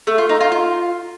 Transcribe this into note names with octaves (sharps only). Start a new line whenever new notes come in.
A3
F4
D#4
F4
F4